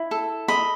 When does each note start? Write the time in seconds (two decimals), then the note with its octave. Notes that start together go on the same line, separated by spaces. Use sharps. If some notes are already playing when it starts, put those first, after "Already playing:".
Already playing: E4
0.11 A4
0.48 D#5 B5